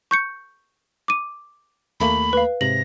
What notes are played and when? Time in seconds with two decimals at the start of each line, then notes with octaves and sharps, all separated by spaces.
0.11 C#6 G6 C#7
1.08 D6 D#7
2.00 D#2 A3 A#3 B5
2.33 B4 F5
2.61 G#2 C3 A#6 F#7